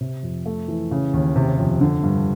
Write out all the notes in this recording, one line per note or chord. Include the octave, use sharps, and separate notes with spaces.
C3
F2
A3
E3
C#3
D#2
C3
F2
D3
G2